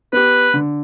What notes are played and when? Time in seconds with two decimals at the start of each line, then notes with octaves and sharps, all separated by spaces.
0.13 B3 G4 B4
0.54 D3